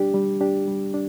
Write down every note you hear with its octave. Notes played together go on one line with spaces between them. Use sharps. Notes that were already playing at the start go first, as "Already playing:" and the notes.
Already playing: G3 D4 G4
G3
D4 G4
G3
D4